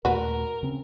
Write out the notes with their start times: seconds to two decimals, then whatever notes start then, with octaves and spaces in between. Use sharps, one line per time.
0.05 D#2 A#2 A3 F#4 A#4 B4
0.63 C#3 C4 C#4